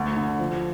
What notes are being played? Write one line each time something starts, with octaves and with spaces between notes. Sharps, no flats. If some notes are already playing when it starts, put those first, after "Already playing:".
Already playing: D2
D3
F3